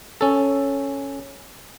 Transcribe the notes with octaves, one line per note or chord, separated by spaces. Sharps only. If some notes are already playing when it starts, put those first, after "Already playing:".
C#4 A4